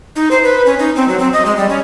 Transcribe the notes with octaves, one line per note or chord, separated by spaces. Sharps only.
D#4
C5
B4
C#4
D#4
C4
F#3
C4
D#5
G#3
G3
C#4